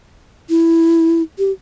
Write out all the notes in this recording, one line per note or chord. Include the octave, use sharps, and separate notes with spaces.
E4
G4